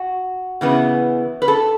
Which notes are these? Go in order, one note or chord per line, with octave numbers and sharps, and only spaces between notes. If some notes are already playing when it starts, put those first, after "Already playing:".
Already playing: F#4
C#3 E3 B3
B4
A4